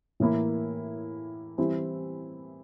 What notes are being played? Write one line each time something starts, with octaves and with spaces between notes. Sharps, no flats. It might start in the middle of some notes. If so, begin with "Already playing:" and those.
A2 E3 A#3 E4
E3 G3 C4 E4